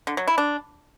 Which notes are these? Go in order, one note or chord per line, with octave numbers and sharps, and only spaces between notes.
D3
F#3
E4
D4